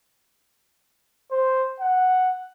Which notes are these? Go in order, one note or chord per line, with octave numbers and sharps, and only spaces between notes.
C5
F#5